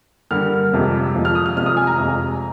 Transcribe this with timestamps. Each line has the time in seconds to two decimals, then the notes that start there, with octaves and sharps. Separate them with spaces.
0.31 G2 D3 G3 A#3 F6
0.72 F1 F2 C3 F3 G#3
1.14 F1 F2 C3 F3 G#3
1.25 F6
1.35 D#6
1.46 F6
1.56 F1 F2 C3 F3 G#3 F6
1.66 D#6
1.77 G#5
1.87 A#5
1.98 F1 F2 C3 F3 G#3